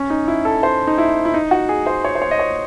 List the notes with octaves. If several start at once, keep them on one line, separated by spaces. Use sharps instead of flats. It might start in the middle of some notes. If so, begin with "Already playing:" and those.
Already playing: C#4
D#4
E4
A4
C5
D#4
E4
E4
D#4
F#4
G#4
C5
C#5
C5
C#5
D#5
C#5